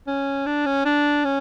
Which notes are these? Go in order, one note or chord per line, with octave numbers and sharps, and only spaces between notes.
C#4
D4
C#4
D4
C#4